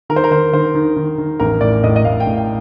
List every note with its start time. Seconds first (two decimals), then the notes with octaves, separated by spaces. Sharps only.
0.10 D#3 A#4
0.16 C5
0.24 A#4
0.31 D#3 C5
0.53 D#3 C5
0.75 D#3
0.96 D#3
1.18 D#3
1.40 A1 A#4
1.61 A2 D5
1.84 A2 D#5
1.96 D#5
2.05 A2 F5
2.20 G5
2.27 A2
2.38 G5